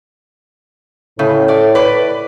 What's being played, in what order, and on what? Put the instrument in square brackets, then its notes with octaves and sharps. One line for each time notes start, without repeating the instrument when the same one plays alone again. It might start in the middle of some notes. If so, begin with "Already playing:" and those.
[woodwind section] A2 [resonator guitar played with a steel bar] C#3
[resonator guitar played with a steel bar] A3 D5
B4 D5